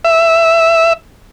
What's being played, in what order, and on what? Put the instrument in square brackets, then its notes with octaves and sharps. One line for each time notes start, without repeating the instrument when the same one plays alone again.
[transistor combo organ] E5